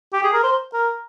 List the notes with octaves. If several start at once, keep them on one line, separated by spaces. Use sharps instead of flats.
G4
G#4
A#4
C5
A#4